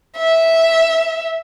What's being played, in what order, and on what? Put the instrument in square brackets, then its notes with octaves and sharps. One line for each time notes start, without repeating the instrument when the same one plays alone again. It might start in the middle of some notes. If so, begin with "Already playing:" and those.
[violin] E5